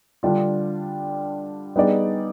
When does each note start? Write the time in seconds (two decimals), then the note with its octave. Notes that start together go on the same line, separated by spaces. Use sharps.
0.23 D3 G3 D4 F4
1.76 G3 B3 D#4 G#4 D5